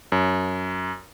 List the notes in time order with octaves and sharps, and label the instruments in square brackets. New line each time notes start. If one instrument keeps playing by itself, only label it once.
[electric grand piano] F#2